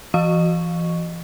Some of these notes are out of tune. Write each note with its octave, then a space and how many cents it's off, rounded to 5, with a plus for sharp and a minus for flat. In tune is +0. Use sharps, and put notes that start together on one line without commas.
E3 +40 D#5 -25 C#6 +0